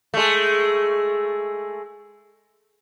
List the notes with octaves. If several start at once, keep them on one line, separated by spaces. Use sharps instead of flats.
G#3 A3